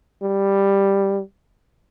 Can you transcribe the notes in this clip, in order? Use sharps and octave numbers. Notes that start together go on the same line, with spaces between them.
G3